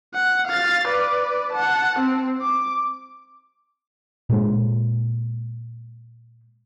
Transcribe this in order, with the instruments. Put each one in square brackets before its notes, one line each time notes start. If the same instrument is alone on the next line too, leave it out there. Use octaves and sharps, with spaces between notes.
[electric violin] F#5
F5 A6
B4 D5
F#5 A5
C4
D6
[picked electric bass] A#2 G#3